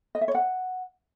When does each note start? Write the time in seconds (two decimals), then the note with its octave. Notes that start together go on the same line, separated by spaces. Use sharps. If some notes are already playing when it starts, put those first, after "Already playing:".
0.15 D#5
0.21 E5
0.28 C#5
0.35 F#5